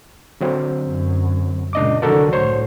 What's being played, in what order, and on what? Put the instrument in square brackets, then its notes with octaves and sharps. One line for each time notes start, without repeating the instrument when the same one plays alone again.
[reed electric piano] D3 F#3 C4
[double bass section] F#2
[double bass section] C#2 A#2 [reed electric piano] D4 D#5 D6
[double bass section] C2 D3 F#3 [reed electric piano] A4 A#4 D5
[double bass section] A2 [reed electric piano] C5 C#5